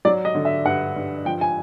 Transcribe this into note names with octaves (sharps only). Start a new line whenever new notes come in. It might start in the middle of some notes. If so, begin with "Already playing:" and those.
F#3 D5
D#5
D3
E5
G2 F#5
G2
F3 G5
G#5